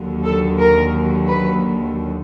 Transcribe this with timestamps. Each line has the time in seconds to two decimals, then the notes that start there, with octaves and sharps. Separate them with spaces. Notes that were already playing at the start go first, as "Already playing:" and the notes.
Already playing: D#2 D3 F#3
0.25 A4
0.59 A#4
1.28 B4